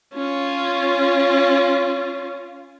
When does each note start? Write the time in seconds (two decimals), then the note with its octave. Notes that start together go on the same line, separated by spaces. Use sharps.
0.15 C#4 F4